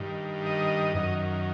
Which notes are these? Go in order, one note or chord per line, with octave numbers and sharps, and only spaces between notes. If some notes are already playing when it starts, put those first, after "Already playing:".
Already playing: G2 D#3
D#5
F#2 D#3